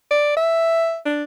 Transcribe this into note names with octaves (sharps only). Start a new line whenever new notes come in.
D5
E5
D4